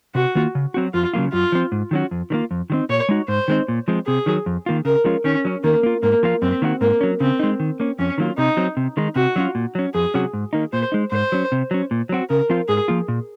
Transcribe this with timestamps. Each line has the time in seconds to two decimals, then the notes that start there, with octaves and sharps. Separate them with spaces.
0.15 C3 F#4
0.35 D#3 A#3 F4
0.55 C#3
0.74 F#3 C4 F#4
0.94 F2 F4
1.14 C#3 F#3 A#3 F4
1.33 F#2 F4
1.52 F3 C4
1.72 G#2
1.91 D#3 F#3 C#4 F#4
2.11 F2
2.30 D#3 F#3 A#3 F4
2.51 F2
2.70 D#3 F#3 C4 D#4
2.89 A#2 C#5
3.09 G#3 D#4 F#4
3.28 G#2 C5
3.48 D#3 G#3 C4 D#4
3.68 A#2
3.88 F3 G#3 C4
4.07 C3 G#4
4.26 D#3 F#3
4.46 F2
4.66 D#3 A#3 F4
4.85 C#3 A#4
5.04 F3 G#3 C#4 F4
5.24 D#3 C#4
5.45 F#3 C#4
5.64 D#3 A#3
5.83 A#3 F4
6.03 G#2 A#3
6.23 F3 A#3 F4
6.42 F#2 C4
6.62 D#3 A#3 D#4 F#4
6.81 G#2 A#3
7.01 F#3 C#4
7.20 C#3 C4
7.39 G#3 D#4
7.60 D#3
7.80 A#3 C#4
7.99 F2 C#4
8.18 D#3 F#3 A#3 F4
8.38 C3 D#4
8.57 F#3 C4
8.77 C3
8.97 D#3 G#3 D#4
9.16 C3 F#4
9.36 F#3 C#4 F4
9.55 A#2
9.75 F#3 C#4
9.94 F2 G#4
10.14 C3 F#3 C#4 F#4
10.33 G#2
10.53 D#3 A#3 D#4
10.73 A#2 C5
10.92 G#3 D#4
11.12 G#2 C5
11.32 F#3 C#4
11.52 C3
11.71 F#3 C#4
11.91 A#2
12.09 F#3 C4 F#4
12.30 C#3 A#4
12.50 F3 C4 F4
12.69 G#2 G#4
12.88 F3 A#3 F4
13.08 A#2